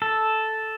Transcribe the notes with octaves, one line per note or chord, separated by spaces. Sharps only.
A4